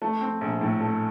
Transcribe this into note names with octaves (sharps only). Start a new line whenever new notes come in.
A3
C4
A#1
A2
A3